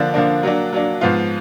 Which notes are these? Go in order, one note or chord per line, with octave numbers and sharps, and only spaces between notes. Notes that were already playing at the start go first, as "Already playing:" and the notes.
Already playing: D3 F3 A#3 D4
D3 F3 A#3 D4
F#3 A#3 D4
F#3 A#3 D4
G#2 F3 B3 F4